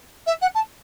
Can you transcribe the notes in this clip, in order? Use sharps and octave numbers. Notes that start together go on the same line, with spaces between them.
E5
F#5
A5